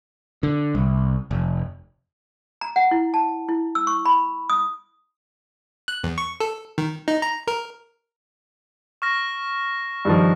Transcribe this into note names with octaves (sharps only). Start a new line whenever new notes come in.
D3
C2
F1
A#5
F#5
E4
A5
E4
E6
C#6
B5
D#6
F#6
E2
C#6
A4
D#3
D#4
A#5
A#4
C#6 F6 A#6
G2 D#3 F3